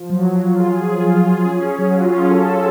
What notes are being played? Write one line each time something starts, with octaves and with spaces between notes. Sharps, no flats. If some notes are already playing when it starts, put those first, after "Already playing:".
Already playing: F3
F#3
F#3
F4
G#4
G#4
F4
F4
G#4
C#4
C#4
F#3
F4
C#4
A4
A4